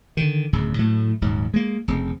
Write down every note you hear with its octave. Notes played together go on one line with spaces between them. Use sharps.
D3 D#3
D1 F#2 C#3
A2 F#3 A3
D#1 G#2 F#3
G#3 A#3
F1 C#3 C4